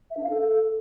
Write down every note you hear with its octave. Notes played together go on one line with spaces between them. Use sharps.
E5
D4
F5
A4